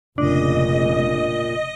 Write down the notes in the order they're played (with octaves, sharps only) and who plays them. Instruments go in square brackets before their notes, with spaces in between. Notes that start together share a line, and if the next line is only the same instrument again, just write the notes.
[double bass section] F1 C#3 [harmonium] A#2 [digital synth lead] D4 [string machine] D#5